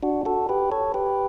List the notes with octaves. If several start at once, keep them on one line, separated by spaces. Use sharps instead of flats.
D4 F#4
F#4 A4
G4 B4
A4 C#5
G4 B4